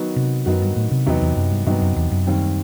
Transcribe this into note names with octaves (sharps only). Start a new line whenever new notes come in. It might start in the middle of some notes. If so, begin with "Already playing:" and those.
Already playing: D#3 F#3 B3 D#4 F#4
C3
F#2 D#3 F#3 B3 D#4 F#4
G2
A2
C3
E2 C3 F#3 B3 D#4
E2
F#2
G2
G2 C3 F#3 B3 D#4
F#2
E2
F#2
D#2 D#3 G3 C4